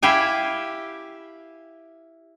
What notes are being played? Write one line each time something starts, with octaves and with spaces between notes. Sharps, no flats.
E4 G4 F5 G5 G#5